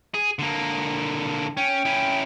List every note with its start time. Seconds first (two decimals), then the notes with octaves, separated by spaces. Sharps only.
0.14 G#4
0.39 D3 A#3
1.57 C#4 G5
1.85 C#4 E4